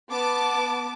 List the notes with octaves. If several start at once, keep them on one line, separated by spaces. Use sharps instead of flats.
B3 A5 D6